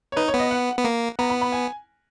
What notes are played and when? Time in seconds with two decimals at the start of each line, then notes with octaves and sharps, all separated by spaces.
0.12 C#5
0.16 D#4 B4
0.28 C#5
0.34 B3
0.39 D#5
0.51 F#5
0.77 B3
0.85 A#3
1.19 B3 A#5
1.30 B5
1.41 B5
1.52 G#5